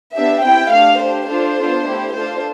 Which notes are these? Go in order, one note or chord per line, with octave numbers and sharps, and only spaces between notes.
B3 D4 G4 E5
C4 E4 G4 G5
A3 D4 G4 F5
D4 G4 C5
D4 F4 A4 C5
B3 D4 F4 A4
A3 E4 G4
D4 F4 A4 C5